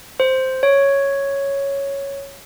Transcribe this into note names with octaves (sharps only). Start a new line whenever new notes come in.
C5
C#5